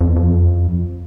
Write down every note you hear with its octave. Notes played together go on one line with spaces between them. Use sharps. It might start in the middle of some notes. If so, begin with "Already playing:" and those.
F2
E2
F2